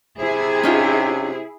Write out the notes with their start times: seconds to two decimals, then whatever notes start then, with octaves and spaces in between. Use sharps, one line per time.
0.20 C3 E4 G#4
0.63 C#4 D#4 F4